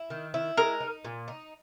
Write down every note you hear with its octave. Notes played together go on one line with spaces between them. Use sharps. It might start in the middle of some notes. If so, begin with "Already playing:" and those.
Already playing: E4
D#3
E4
G#3 A#4
D#4
A#2
D#4